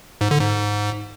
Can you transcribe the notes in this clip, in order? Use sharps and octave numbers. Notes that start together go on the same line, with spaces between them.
G#2
D3
G#2